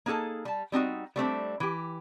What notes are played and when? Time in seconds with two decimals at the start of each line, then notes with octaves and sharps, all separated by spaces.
0.06 A#3 D#4 G#4 A4 A5
0.45 G3 A5
0.72 G3 C4 D#4 F#4
1.16 G3 A3 C4 D4
1.60 E3 G4